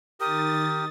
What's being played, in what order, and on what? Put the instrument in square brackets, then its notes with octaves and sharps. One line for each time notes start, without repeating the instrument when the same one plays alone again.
[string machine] D#3 A6 [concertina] G4 A#4 [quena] D#6